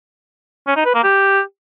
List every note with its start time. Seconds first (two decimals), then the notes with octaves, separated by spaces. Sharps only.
0.67 C#4
0.76 D#4
0.85 B4
0.94 A#3
1.04 G4